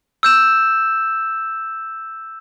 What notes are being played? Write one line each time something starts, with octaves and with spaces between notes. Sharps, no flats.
E6 G6 E7